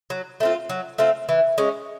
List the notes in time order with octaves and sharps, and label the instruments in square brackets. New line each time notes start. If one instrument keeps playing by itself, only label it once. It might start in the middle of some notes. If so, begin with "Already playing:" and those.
[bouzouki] F#3
A3 C4 F4
F#3
A3 C4 F4
E3
G#3 C#4